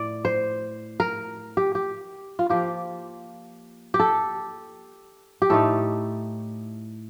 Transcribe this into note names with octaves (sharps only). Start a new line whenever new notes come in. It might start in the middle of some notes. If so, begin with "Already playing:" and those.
Already playing: A2 D5
C5
A#4
G4
G4
F4
F3 A#3 F4 G4
G4
A4
G4
A2 A3 D#4 A4